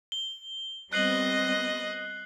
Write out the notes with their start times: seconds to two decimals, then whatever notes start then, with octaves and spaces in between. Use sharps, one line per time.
0.12 G7
0.93 G3 B3 C4 D#5 F#6 C7 F#7